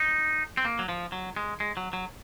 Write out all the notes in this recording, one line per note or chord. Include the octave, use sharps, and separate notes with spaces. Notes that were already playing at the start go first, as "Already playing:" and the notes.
Already playing: D#4
C4
A#3
F#3
F3
F#3
G#3
G#3
F#3
F#3